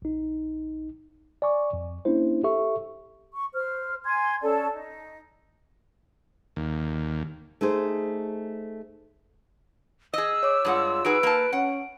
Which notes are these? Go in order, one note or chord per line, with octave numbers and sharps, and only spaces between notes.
A#1 D#4
D5 G#5 C#6 D6
F2
A#3 C#4 D4 E4 C5
G4 A4 E5 C#6
C#6
C5 F6
G#5 C6 G#6
C#4 A4 D5 A5
D#4
D#2
A3 D#4 G#4 C5
G#4 D#5 E6
C#5 D6
G2 G#3 F4 F#5
D#4 F#4 G#4 B4 D7
A#3 A5 D7
C#4 F#5